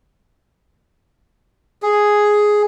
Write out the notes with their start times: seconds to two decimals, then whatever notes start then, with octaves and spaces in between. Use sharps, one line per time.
1.82 G#4